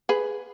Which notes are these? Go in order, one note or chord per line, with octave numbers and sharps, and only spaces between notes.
G#4 B4